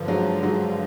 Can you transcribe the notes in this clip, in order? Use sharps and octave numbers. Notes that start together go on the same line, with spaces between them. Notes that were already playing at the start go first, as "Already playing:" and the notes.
Already playing: G2 D3 F3
F#3 G#3
F#3 G#3